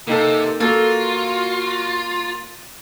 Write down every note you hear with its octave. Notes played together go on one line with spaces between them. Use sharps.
C3 A#3 D#4 A4
A#3 F4 F#4 A4